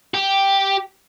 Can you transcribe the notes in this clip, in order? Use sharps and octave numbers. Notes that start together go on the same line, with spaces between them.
G4